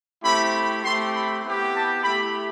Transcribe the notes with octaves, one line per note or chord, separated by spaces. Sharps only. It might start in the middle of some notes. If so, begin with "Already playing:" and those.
A3 C4 E4 G4 B5
A3 C4 G4 C6
B5
B3 E4 G4
A5
A3 E4 G4 B5